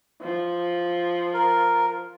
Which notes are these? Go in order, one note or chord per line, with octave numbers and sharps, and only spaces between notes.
F3
A#4